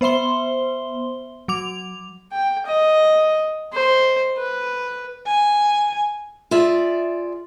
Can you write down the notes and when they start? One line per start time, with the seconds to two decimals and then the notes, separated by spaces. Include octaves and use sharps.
0.01 B3 C5 E5 C6 G7
1.48 F#3 D6 F7
2.32 G5
2.66 D#5
3.73 C5
4.38 B4
5.27 G#5
6.51 F4 G#4 D5 E5